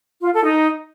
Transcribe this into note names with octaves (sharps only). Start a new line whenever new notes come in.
F4
A4
D#4